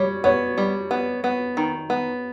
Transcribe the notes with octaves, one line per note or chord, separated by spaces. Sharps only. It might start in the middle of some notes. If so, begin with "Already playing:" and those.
Already playing: G3 C#5
B3 C#5
G3
B3
B3
D#3
B3